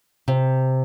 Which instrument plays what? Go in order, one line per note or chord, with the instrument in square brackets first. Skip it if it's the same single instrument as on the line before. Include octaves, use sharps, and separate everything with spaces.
[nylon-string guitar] C3